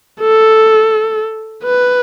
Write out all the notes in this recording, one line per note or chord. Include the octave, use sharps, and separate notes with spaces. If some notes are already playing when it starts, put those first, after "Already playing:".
A4
B4